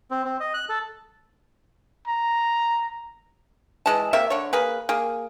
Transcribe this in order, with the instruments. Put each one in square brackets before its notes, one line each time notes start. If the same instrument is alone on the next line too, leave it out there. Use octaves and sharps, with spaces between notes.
[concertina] C4
C4
D#5
F#6
A4
[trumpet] A#5
[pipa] E3 G#3 A5
C3 A#3 E5
D3 C#5
A#3 G#4 B4
A#3 G#4